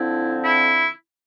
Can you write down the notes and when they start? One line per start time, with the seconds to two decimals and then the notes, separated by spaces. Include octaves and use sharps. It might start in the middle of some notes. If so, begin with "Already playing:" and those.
Already playing: D3 F3 C4 E4
0.43 E4